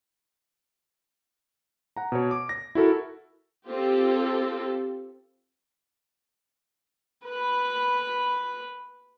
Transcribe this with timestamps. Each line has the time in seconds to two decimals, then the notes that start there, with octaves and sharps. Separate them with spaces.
1.96 F#5 A#5
2.12 B2 C#5
2.31 D6
2.49 A#6
2.75 E4 F#4 A4 A#4
3.68 C4 F4 G4 A4
7.25 B4 B5